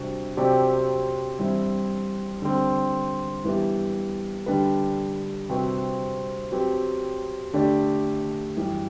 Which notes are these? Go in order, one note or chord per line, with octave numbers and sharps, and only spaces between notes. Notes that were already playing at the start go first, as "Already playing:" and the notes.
Already playing: C3 G3 D4 F#4
C3 F#3 C4 G4 D5
G2 E3 G3 C4 E4
D3 G3 C4
G2 E3 B3 E4 G4
D3 G3 D4 G4 B4
C3 G3 C4 F#4 B4
F#3 C4 G4 B4
D3 A3 D4 G4 D5
F#2 E3 G3